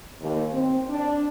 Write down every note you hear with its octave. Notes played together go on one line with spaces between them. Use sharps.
D#2
C4
D4